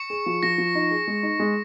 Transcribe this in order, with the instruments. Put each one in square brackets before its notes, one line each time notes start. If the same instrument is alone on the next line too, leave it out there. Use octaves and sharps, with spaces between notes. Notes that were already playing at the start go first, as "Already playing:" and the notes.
Already playing: [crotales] C#6 C#7
[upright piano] G#4
F3
[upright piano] F3 [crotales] A#6
[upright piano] F3
D#4
G#4
G#3
D#4
G#3